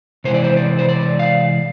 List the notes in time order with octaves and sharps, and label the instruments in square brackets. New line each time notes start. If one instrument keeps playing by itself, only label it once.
[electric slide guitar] C3 E3 G#3 C5
D5
C5
D5
C5
D5
F5